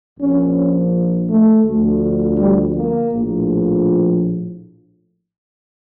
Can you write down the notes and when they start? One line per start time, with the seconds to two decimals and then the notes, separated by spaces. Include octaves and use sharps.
0.18 A#1 A#2 F3 C#4
1.28 A3
1.64 D2 D3 F3
2.37 G3
2.75 A#3
3.11 A#1 A2 F3